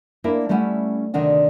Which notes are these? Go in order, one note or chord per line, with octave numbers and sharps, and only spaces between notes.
A#3 D4 E4 A#4
G3 A3 C#4 E4 F#5
D2 C3 D#3 D4 F#5